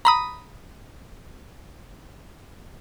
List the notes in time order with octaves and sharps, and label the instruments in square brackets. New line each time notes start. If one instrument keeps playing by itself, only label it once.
[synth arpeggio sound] A#5 B5 D#6